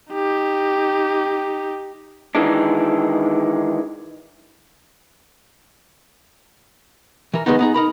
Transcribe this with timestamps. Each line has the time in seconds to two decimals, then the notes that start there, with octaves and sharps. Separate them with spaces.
0.11 D#4 G4
2.35 D#3 E3 G#3 D4
7.34 E3 A#4
7.46 D#3 E3 G#3 A#3 B3 D#4
7.59 B3 D#4 G#4
7.74 D#4 A#4 B5